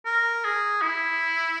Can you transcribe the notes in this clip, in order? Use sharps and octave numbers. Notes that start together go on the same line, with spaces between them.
A#4
G#4
E4